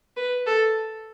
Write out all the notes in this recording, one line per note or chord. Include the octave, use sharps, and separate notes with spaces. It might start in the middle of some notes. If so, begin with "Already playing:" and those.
B4
A4